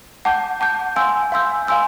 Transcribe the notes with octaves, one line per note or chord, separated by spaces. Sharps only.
F#5 A5 D6 G6
F#5 A5 D6 G6
F5 G#5 C6 E6 G6
F5 G#5 C6 E6 G6
F5 G#5 C6 E6 G6